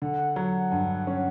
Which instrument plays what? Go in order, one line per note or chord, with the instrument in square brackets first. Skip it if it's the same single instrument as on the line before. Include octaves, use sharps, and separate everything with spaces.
[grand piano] D3 [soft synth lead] F#5
[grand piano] F#3
G2
C#4